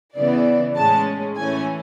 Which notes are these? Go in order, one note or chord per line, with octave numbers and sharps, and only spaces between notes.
C#3 E3 B3 D5
A2 G#3 C#4 A5
A2 E3 A3 C#4 G#5